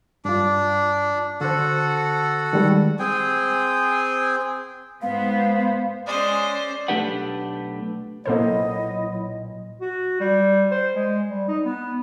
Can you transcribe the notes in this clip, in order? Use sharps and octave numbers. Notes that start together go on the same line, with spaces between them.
G2 D4 F4
D3 F#4 A4 C5 F#5
D#3 G3 G#3
C4 G#4 G5 G#5
G#2 B3 C5 F5
G#3 C#4 C5 D5
B1 A3 D4 G4 B4 F#5
B1 A#2 F#3 A#3 E4 A4 C5 D#5
F#4
G3
C5
G#3
G3
D#4
B3